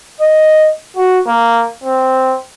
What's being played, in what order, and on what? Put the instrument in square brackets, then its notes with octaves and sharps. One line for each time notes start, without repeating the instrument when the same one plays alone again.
[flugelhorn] D#5
F#4
A#3
C4